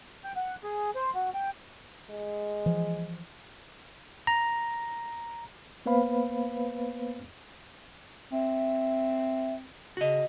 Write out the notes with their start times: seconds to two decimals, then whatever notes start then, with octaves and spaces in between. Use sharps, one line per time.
0.24 G5
0.36 F#5
0.64 G#4
0.95 C5
1.15 F#4
1.34 G5
2.10 G#3
2.66 E3 F3
4.27 A#5
5.86 A#3 B3 B4 C5 F5 B5
8.32 C4 E5
9.97 C#3 F#4 D#5